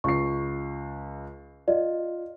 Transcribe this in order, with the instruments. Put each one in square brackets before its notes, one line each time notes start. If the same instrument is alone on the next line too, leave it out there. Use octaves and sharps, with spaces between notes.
[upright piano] C#2 C7 [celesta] C#6
[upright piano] F4 [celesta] D5 D#5